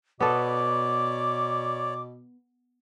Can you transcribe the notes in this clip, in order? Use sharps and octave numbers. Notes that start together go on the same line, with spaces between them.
B2 B3 A4 C#5 D5 D6